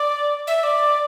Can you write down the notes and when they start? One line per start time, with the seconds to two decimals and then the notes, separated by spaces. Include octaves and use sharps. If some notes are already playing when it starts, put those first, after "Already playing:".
Already playing: D5
0.47 E5
0.63 D5